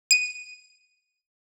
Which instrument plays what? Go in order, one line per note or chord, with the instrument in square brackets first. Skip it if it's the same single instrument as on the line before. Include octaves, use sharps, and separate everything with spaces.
[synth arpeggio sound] D#7